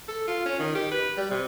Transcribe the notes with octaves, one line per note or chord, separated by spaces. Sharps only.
A4
F4
C#4
D#3
G4
B4
G3
C3